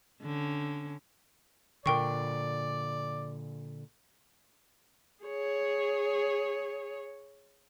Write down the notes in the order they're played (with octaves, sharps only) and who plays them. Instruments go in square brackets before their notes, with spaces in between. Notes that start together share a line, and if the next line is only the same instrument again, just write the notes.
[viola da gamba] D3 C#4
[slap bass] A#2 D3 [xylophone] A#4 G5 C#6 [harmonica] D5
[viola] G#4 C#5